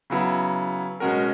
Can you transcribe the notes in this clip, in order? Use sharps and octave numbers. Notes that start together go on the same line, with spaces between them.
C#3 F#3 B3 E4
B2 G#3 C#4 F#4 A#4